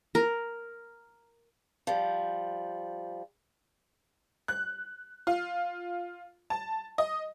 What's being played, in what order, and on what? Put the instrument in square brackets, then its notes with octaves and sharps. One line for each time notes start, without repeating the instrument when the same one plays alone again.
[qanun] A#4
[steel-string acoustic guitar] F3 G3
[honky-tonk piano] F#6
F4
A5
D#5